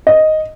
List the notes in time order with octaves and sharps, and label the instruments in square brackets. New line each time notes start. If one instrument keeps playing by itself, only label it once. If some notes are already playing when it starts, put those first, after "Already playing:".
[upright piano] D#5